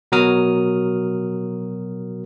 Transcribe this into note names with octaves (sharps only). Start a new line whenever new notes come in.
B2 F#3 F#4 A#4 D#6 F6